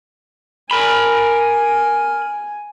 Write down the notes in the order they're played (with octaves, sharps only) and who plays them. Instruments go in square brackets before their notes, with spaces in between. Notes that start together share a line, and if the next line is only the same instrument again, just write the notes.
[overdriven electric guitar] A#4 B5 [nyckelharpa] G#5